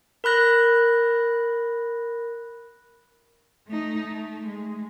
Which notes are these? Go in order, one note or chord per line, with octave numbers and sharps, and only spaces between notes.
A#4 B5 F#6 A#6
A3 D#4
A3
G#3